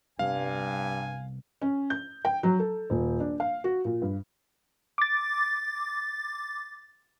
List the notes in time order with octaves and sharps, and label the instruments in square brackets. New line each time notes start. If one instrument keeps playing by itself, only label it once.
[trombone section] G2 [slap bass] C3 G3 B3 [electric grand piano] F5 [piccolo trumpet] G#5
[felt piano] C#4
G6
G5
F#3
A4
D#1
D4
F5
F#4
A#2
G2
[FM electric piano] D6 A6